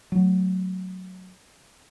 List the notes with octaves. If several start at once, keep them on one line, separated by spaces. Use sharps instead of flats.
F#3 A3